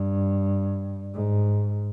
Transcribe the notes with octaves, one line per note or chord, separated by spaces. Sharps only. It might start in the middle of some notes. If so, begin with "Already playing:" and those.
Already playing: G2
G#2